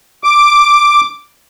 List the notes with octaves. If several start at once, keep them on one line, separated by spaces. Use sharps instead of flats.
D6